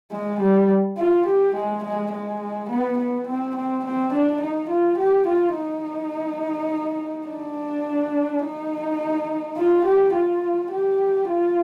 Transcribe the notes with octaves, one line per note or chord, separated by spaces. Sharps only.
G#3
G3
F4
G4
G#3
G#3
G#3
B3
B3
C4
C4
C4
D4
D#4
F4
G4
F4
D#4
D4
D#4
F4
G4
F4
G4
F4